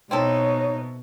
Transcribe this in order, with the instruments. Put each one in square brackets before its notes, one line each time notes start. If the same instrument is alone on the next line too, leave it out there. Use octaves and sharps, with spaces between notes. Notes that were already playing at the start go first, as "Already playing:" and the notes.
[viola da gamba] B2 [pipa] C4 E4 A4 [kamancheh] D#4 [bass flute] C#5